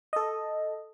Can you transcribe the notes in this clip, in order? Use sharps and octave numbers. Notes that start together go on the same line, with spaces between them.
A4 D#5